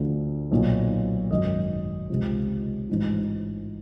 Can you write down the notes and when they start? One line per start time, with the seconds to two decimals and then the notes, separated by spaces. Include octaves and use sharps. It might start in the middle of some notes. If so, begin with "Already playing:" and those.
Already playing: D2 D3 F3
0.51 B1 A#2 F3
1.30 G#1 F#2 D#3 D#5
2.10 C#2 C3 F3
2.90 A1 G#2 F3